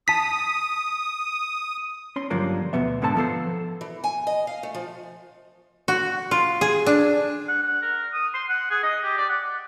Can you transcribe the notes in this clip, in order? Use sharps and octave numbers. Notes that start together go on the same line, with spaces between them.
A5 D#6 B6
C#4 C6
G2 D3 F3 F#3 A#3 D4
D2 B2 B3 E5
G#2 D3 B3 A4 C5 A5
F3 B3 A4 C5
E3
G#5
D#5
F5
A3
F3
F#4
F4
G#4
D4
F#5
F#5
A#4
D#6
C6
F#5
G#4
D#5
G4
D5
F#5